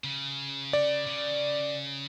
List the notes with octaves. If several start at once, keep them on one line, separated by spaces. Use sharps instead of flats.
C#3
D5
C#3